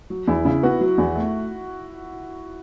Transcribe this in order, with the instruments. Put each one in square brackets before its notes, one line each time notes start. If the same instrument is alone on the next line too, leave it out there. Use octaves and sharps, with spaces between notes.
[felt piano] F#3
[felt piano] E2 [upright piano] E4
[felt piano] C#3 [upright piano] E4
[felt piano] B3 [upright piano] F#4
[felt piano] F#3
E2
A3